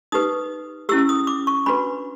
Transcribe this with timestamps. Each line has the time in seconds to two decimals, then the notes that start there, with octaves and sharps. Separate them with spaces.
0.12 D#4 G4 B4 D#6
0.89 C#4 E4 G4 E6
1.09 D#6
1.27 D6
1.47 C#6
1.66 D4 F#4 B4 B5